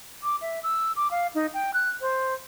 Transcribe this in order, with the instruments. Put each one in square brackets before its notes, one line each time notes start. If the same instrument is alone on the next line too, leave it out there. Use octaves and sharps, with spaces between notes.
[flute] D6
E5
E6
D6
F5
D#4
G5
F#6
C5